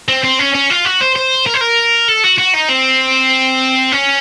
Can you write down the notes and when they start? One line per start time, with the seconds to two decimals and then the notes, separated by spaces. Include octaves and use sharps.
0.09 C4
0.24 C4
0.39 C#4
0.55 C#4
0.70 F4
0.85 F#4
1.01 C5
1.16 C5
1.46 A#4
1.54 C5
1.61 A#4
2.08 A4
2.24 F#4
2.39 F#4
2.54 D#4
2.69 C4
3.92 C#4